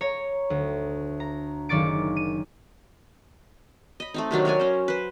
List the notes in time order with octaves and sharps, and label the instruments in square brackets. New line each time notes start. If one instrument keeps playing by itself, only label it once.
[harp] C#5 A#5 C#6
D2
A#5
F#1 D#3 D5 C#6 A6 D7
D#7
[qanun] D#5 B5
A3 C4 D#4
C3 D#3 F#3 D4
A#4 C#5 D5 G#5
C#4 C5
B4 C5